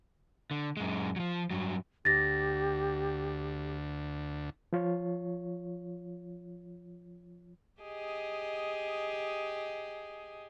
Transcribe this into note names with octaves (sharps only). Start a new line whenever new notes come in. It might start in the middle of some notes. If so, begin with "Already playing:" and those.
D3
F#2 G#3
F3 F#3
G2 F#3
D2 G4 A6 A#6
F3 F4 C#5
G4 G#4 D#5